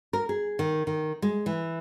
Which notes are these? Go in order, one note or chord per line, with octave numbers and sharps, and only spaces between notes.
A#4
G#4
D#3
D#3
G#3
E3